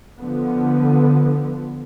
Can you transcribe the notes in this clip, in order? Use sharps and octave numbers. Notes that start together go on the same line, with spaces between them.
D3 F3 B3